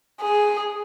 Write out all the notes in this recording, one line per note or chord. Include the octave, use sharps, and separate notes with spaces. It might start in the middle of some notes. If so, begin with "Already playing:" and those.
G#4